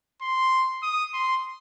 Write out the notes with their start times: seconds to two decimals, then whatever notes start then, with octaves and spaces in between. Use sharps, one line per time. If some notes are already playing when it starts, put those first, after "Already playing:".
0.21 C6
0.83 D#6
1.14 C6